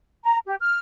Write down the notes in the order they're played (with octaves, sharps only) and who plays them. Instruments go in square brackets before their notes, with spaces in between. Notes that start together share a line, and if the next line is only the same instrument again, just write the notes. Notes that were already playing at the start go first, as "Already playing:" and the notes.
[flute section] A#5
G4
F6